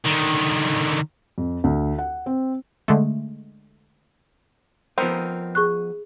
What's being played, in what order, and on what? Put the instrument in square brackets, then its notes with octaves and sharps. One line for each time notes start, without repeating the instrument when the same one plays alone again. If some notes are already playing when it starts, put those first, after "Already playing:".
[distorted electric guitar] D3 D#3
[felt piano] F2
D2
F#5
C4
[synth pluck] D3 G#3 A3
[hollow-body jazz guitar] F3 B3 D#4 [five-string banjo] C4 A#4
[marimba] G#4 C#6 F#6